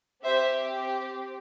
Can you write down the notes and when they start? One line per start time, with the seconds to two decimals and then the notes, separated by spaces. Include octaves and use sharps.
0.24 C4 G4 C5 E5